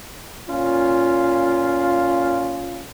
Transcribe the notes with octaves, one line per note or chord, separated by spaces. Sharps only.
A#2 C#4 F4